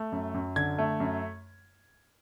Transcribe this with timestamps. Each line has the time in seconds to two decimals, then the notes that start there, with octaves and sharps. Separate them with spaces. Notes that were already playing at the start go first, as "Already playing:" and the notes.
Already playing: A3
0.12 F#2
0.34 F#2
0.56 D3 G#6
0.78 A3
1.00 F#2